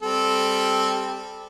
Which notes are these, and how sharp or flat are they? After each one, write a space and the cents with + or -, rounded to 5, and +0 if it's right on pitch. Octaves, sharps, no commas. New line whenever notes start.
G3 +10 C4 +0 A4 -15